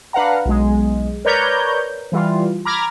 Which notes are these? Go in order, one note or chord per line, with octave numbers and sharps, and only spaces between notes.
D4 B4 F5 F#5 A#5
B1 G#3
A#4 B4 C#5 D5 A#5 G6
E3 G3 F4
A#5 B5 D6 F6 G#6 A#6